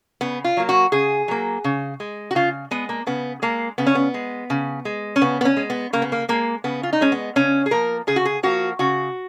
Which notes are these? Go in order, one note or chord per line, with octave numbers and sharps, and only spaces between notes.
C#3 B3
F4
F#3 A#3
F#4
C#3 G#4
F#3 A#3
C#3
G#3
F#4
C#3 F4
G#3 B3
A#3
C#3 B3
G#3 A#3
C#3 B3
C#4
B3
G#3
C#3
G#3
C#4
C#3 B3
B3
C#4
G#3
B3
C#3 A#3
B3
A#3
G#3 A#3
C#3 B3
F4
D#4
G#3 C#4
B3
C#3 C#4
G#4
F3 A#3 A#4
C#3 G#4
F#4
G#4
F3 A#3 F#4
C#3 F#4